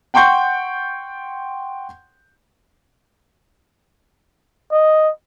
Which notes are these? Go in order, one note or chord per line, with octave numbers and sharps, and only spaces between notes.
F#5 G5 C6 C#6 G6
D#5